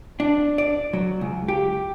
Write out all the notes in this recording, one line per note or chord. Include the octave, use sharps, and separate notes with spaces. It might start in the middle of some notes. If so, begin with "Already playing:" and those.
D4
D5
F#3
C#2
G4